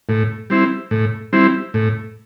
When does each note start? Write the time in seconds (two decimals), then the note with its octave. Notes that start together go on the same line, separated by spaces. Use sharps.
0.09 A2
0.50 G3 C4 E4
0.91 A2
1.33 G3 C4 E4
1.74 A2